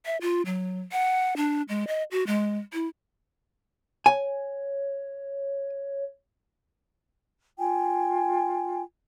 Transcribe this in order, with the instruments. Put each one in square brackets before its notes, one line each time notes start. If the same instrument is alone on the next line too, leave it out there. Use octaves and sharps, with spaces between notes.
[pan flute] E5
F4
F#3
F#5
D4
G#3
D#5
F#4
G#3
E4
[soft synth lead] C#5 [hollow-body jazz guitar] G#5
[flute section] F4 G5 G#5